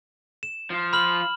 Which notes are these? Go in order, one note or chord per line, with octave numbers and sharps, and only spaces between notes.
E7
F3 F4
B5 F6 F#7